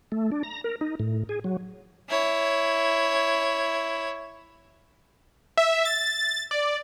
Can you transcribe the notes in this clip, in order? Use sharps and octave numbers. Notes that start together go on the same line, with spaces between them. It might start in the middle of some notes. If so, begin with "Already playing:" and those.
A3
D4
A#5
A#4
D#4
A2
G#4
F#3
E4 C#5
E5
A6
D5